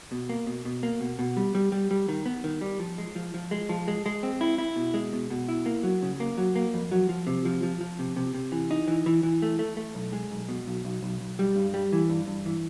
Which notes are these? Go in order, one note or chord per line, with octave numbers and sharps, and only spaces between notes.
B2
A#3
B2
B2
A#3
B2
B2
G3
G3
G3
G3
D#3
B3
D#3
G3
F3
G#3
F3
F3
G#3
F3
G#3
G#3
C4
E4
E4
B2
G#3
B2
B2
E4
A#3
F#3
C#3
A#3
F#3
A#3
F2
F#3
F3
C3
F3
F3
F3
C3
C3
C3
E3
D#4
E3
E3
E3
A3
A3
A3
B1
G#3
B1
B2
B1
B1
B1
B1
G3
G2
G3
E3
G2
G2
E3